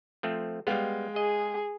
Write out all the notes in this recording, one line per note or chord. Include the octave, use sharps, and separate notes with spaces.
F3 A3 C4
G3 G#3 B3 F5 G5
G#4 D#5